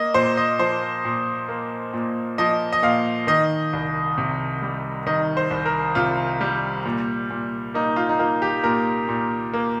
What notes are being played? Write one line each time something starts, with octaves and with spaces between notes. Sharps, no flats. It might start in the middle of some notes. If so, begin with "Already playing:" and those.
Already playing: A#3 D#5
A#2 C5
D#5
F3 C5
A#2
A#3
A#2
F3 D#5
D#5
A#2 F5
D#3 D#5
C2
C3
G3
D#3 D#5
C5
C2
A#4
C3 F4
G3
A#2
A#2
A#3 D#4
F4
D#4
A#3 F4
G4
A#2 A#4
A#2
A#3